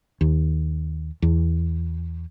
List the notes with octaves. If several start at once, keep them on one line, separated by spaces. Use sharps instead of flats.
D#2
E2